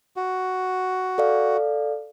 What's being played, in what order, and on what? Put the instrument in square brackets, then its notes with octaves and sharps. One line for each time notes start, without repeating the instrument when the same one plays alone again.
[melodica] F#4
[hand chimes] A4 D5 F5